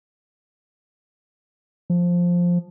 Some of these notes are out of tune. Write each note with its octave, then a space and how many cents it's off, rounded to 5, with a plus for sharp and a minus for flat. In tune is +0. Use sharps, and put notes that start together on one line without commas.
F3 +5